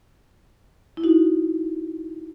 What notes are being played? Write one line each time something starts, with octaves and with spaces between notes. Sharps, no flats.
E4
D#4 F#4